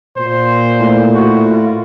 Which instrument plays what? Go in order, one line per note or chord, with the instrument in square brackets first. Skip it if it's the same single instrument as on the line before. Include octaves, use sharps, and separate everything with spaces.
[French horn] A#2 [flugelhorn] C5
[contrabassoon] A2
[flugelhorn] F#4
F4